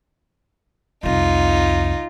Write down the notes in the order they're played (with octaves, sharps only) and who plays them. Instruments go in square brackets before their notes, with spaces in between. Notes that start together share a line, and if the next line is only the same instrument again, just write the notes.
[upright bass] C2 F2 [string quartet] D#4 F4